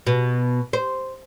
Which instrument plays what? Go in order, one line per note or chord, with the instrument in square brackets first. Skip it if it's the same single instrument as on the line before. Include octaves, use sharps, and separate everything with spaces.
[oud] B2
C5